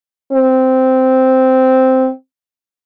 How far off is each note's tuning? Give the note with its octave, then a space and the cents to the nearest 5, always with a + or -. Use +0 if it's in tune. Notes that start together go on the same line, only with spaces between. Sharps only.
C4 -10